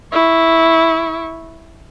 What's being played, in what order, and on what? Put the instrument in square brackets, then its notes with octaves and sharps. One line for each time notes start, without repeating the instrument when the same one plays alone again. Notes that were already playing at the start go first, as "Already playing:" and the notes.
[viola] E4 C#6